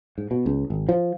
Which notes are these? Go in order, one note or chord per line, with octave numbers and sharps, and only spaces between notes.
G#2
B2
C#2
G#1
F3